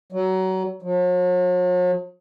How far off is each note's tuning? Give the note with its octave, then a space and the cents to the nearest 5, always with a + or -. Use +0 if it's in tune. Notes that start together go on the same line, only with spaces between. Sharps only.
F#3 +25
F#3 -45